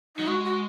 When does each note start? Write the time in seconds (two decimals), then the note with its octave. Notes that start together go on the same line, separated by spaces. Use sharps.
0.16 F#3 D#4
0.27 G#3 F#4
0.45 F#4